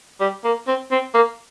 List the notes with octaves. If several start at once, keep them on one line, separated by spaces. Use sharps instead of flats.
G3
A#3
C4
C4
A#3